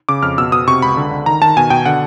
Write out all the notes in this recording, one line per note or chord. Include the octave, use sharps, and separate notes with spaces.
C#3 D6
F2 F6
B2 E6
B2 D#6
C3 C#6
C#2 B5
D3
D3
D#3 A#5
D#3 A5
B2 G#5
B2 G5
D3 F#5